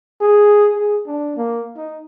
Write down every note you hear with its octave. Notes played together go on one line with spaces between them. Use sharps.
G#4
G#4
D4
A#3
D#4